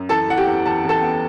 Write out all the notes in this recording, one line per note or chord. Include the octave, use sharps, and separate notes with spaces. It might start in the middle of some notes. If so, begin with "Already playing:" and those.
Already playing: F#2
E3 A4 A5
E3 F#5
G4 G5
E2
E2 A5
E2 A4 A5
B3